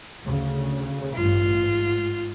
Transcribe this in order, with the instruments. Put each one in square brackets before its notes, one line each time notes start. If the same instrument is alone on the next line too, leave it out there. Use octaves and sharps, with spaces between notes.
[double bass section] D2 C#3
[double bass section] A1 G2 [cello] F4
[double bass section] G#2